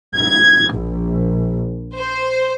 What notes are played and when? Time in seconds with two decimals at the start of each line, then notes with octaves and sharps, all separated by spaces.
0.16 G#6
0.72 A#1
1.97 C5